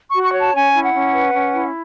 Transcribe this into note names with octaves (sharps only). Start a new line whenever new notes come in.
F#4 C#6
C#6
C#5
A5
C#4 G#5
E4
F#5
C#4
B4
C#4
E4